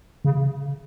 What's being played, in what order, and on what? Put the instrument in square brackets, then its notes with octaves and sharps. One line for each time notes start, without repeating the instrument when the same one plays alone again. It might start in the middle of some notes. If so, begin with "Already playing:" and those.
[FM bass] C#3